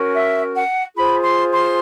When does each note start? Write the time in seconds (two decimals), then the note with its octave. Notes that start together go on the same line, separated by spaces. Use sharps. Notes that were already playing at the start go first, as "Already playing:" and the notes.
Already playing: C#4 F#4 A#4
0.12 E5
0.54 F#5
0.95 F4 G#4 C5 B5
1.23 C6
1.51 C6